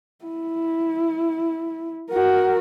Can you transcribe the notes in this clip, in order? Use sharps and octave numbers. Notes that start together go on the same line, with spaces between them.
E4
F#4 A#4